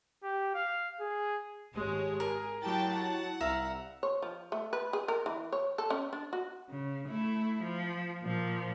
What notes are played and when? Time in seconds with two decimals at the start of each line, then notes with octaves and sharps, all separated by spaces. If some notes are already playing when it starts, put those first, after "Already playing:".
0.23 G4
0.54 F5
1.00 G#4
1.74 G#1 G#3 G4 C#5
2.20 G#4 A#4
2.62 F#3 G#3 E4 G4 G5 A5 A6
2.92 F#5
3.41 C2 E5 F5 A#5
4.03 C#5
4.22 F3
4.52 A3
4.73 B4
4.93 G#4
5.08 A#4
5.26 E3
5.52 C#5
5.78 A4
5.90 C#4
6.13 D4
6.33 F#4
6.69 C#3
7.08 A3 E4
7.63 F3
8.23 A#2 F3